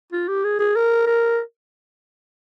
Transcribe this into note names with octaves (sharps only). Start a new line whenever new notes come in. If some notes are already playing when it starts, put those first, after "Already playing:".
F4
G4
G#4
G#4
A#4
A#4